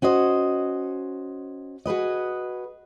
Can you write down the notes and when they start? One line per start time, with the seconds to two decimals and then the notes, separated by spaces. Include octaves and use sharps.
0.02 C#4 F#4 C5 D#5
1.85 F#4 G#4 B4 D#5